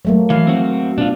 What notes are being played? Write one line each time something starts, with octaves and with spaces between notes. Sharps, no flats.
F#3 A3 A#3
E3 F5
C4 F#4
B2 D4 F4